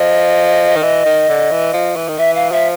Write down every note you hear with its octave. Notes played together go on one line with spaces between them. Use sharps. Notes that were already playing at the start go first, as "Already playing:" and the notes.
Already playing: F3 D#5
D#3
E3
D#3
D3
E3
F3
E3
D#3
E3 E5
F5
F3 E5